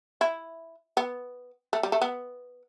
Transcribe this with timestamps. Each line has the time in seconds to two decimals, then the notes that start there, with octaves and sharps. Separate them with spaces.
0.21 E4
0.97 B3
1.73 A3
1.83 G3
1.92 A3
2.02 B3